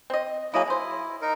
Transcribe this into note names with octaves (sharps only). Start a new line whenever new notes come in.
C4 D#5
F#3 A#3 E4 G#4 D#5
E4 G#4 C5
D#4 A#4